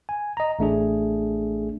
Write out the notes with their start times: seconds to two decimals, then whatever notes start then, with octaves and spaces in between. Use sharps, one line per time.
0.09 G#5
0.37 D#5 A#5
0.59 A1 A3 D4 G#4